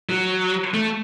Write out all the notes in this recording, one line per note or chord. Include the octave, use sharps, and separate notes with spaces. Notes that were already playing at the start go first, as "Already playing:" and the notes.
F#3
A3